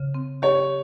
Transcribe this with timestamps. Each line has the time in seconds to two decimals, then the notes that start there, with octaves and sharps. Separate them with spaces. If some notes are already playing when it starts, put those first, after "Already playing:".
Already playing: C#3
0.14 C4
0.42 G4 C#5